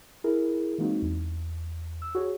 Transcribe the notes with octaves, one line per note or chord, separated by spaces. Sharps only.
E4 G#4 A#4
E3 G#3 A#3 C4 D#4 F#4
E2
E6
F#4 G#4 C#5